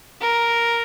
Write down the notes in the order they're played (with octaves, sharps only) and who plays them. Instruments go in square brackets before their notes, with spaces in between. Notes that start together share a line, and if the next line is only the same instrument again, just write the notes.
[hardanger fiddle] A#4